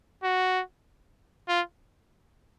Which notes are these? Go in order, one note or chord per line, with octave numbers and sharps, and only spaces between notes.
F#4
F4